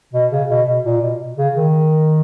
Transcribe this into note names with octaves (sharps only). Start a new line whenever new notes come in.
B2
C#3
B2
B2
A#2
B2
C#3
D#3